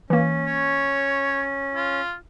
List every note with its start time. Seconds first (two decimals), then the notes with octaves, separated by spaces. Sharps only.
0.10 E3 A#3 C#4
0.46 C#5
1.75 F4